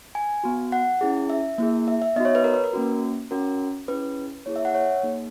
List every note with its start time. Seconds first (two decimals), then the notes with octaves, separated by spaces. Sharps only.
0.15 G#5
0.44 B3 F#4
0.72 F#5
1.01 C#4 E4 G#4
1.30 E5
1.58 A#3 E4 G#4
1.88 E5
2.02 E5
2.16 B3 D#4 F#4 D#5
2.25 C#5
2.35 B4
2.44 A#4
2.54 B4
2.64 A#4
2.73 A#3 C#4 F#4
3.31 C#4 F#4 A#4
3.88 C#4 E4 G#4 B4
4.46 A#3 E4 G#4 C#5
4.56 E5
4.65 F#5
4.75 C#5
5.03 A#3 D#4 G#4